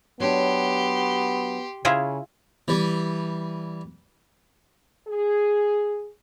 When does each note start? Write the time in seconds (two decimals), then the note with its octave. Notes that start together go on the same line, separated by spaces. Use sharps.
0.20 F#3 B3 D4 G4 C6
1.85 C#3 E4 F4 G#4
2.68 E3 G3
5.08 G#4